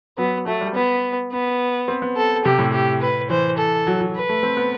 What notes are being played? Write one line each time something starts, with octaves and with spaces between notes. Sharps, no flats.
F#3 B3
F#3 A3
G3
B3
B3
C4
B3
A4
C3 G4
A2
G4
B4
E3 C5
A4
F#3
F#3
B4
A3
C4
B3